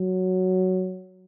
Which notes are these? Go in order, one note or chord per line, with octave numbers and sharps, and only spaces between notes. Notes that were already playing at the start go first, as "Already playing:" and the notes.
Already playing: F#3